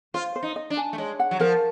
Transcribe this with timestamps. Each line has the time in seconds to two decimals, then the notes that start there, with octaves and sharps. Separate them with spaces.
0.14 F4 C5
0.36 C5
0.43 D#4
0.56 D#5
0.70 D4
0.77 G#5
0.93 A3
0.98 G#3 C#5
1.19 F#5
1.31 F#3
1.39 F3 A#4